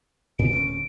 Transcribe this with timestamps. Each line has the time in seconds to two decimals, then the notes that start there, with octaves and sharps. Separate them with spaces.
0.39 A2 D7
0.53 D1 D2 C#4